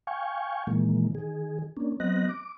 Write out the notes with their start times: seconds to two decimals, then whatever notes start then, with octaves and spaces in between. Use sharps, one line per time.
0.07 F5 G5 G#5 C#6
0.67 A#2 D#3 E3 G#3 A#3
1.15 D#3 G#4
1.77 A#3 C#4 D4
2.00 F#3 B3 C4 D#5 F#6 A#6
2.29 D6